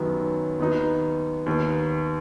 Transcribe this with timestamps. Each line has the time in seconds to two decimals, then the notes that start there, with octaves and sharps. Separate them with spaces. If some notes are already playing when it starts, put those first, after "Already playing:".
Already playing: F#2 D#3 F#3 B3
0.59 D#2 D#3 B3 D#4
1.46 D#2 D#3 B3